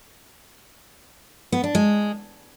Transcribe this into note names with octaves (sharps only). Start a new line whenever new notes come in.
B3
D4
G#3